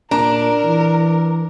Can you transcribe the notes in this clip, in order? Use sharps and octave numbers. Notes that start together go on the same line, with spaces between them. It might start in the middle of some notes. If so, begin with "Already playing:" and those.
A#2 D4 A#4 A#5
E3